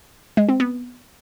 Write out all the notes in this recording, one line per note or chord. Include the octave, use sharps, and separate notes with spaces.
G#3
C4
B3